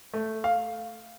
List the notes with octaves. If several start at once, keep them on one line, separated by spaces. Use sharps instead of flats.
A3
F5